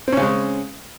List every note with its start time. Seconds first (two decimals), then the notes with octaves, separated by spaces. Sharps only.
0.08 C4
0.12 C#4
0.17 C#3
0.22 G#3